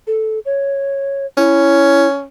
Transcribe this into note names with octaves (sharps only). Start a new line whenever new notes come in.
A4
C#5
C#4 E4